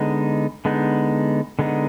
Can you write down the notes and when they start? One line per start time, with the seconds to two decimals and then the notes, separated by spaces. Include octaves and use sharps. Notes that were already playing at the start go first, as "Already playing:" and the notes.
Already playing: D3 G#3 B3 D#4
0.65 D3 G#3 B3 D#4
1.59 D3 G#3 B3 D#4